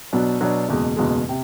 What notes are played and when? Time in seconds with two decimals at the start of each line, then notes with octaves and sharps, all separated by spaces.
0.13 B2 F#3 B3 D4
0.41 B2 F#3 B3 D4
0.69 F#1 E2 B2 G#3
0.96 F#1 E2 B2 G#3
1.29 C3